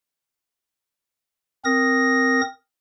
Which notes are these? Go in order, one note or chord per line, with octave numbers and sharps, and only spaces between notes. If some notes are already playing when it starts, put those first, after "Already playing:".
C4 A#4 D#6 A#6